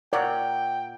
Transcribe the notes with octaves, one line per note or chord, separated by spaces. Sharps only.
A#2 A#4 C#5 D5 F#5 G5 A#5